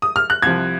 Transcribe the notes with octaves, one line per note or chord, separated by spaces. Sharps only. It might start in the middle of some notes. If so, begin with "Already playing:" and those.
D#6
F6
F#6
C2 C3 F3 G#6